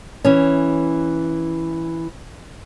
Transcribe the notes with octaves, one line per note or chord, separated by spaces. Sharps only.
E3 C#4